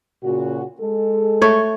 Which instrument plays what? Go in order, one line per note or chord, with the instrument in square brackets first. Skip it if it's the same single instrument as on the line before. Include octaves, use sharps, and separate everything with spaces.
[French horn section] A#2 C#3 F#4
G#3 A4
[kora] A3 C#5